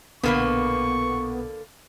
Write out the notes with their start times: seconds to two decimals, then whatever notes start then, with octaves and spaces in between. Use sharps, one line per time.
0.23 B1 A#2 D3 A#3 B3 B4 C#6